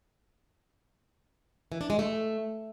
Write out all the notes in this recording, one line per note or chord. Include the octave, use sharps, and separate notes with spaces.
E3
D4
G#3
A3